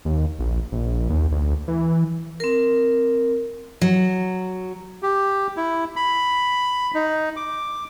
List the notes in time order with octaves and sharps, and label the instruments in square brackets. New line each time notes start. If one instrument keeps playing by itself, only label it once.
[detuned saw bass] D#2
A#1
A#1
D#2
D2
E3
[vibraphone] C4 A#4
[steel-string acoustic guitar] F#3
[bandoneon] G4
E4
B5
D#4
D6